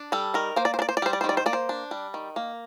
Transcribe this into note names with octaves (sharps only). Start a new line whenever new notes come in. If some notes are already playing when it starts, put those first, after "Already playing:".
Already playing: D4
G3 A4
D#3 A#4
A#3 C5
D5
C5
D4
D5
C5
D5
G3 C5
D5
C5
D#3
D5
C5
A#3 D5
C5
D4
G3
D#3
A#3